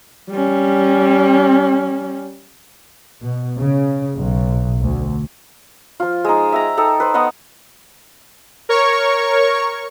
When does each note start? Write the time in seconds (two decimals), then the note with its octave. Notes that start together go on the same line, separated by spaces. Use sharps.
0.30 G3 C#4
3.22 B2
3.58 C#3
4.16 B1
4.81 D2
6.00 F3 F4
6.25 G#3 D#4
6.53 E5 G5 A#5
6.77 D#4 A4 G5
7.00 B4 C5
7.14 B3 D#4 D#5 F#5
8.69 A#4 C#5 C#6